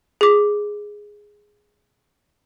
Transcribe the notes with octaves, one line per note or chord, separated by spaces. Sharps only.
G#4 D6